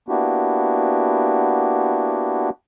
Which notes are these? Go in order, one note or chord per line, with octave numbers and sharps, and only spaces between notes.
A#3 B3 D4 E4 F#4 G4